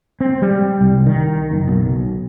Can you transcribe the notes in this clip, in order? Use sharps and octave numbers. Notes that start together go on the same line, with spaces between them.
C4
G3
C2
D#3
F#1
B1